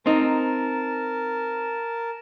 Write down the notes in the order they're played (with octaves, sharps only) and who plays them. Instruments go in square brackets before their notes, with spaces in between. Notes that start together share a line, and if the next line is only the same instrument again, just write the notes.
[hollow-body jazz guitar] C4 D#4 [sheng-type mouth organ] A#4 A5